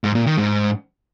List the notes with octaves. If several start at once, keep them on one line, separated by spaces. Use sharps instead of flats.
G#2
A#2
D#3
G#2